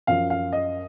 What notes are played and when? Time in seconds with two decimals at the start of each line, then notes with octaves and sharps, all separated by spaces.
0.07 F#2 F3 F5
0.30 F5
0.53 D#5